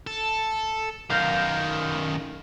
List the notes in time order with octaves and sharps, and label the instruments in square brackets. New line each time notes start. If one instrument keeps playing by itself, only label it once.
[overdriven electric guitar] A4
[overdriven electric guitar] F#2 D#3 [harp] F5 G6 A#6